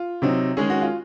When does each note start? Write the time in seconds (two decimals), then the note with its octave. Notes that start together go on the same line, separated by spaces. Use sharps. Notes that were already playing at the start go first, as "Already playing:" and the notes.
Already playing: F4
0.22 C3 F#3 C4 D#4
0.57 D#3 G#3 C#4 G#4
0.70 F#4
0.82 F4